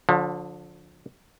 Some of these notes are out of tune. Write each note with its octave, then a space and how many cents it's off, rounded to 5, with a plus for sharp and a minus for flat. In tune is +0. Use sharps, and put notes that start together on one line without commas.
D3 -10 F3 +30